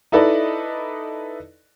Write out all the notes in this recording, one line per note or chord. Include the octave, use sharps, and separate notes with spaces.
D#4 E4 A4 B4 D5 D#5